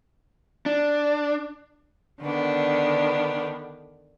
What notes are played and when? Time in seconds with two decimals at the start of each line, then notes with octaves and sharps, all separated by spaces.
0.66 D4
2.21 D3 D#3 B3 D4